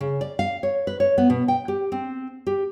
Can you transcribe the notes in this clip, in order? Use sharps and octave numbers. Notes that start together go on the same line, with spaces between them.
C#3
D5
F5
C#5
B4
C#5
B3
B2
G5
G4
C4
G4